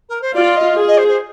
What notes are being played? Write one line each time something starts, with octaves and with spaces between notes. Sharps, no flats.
A#4
C5
F4 D5
D#5
G#4
D#5
C5
C5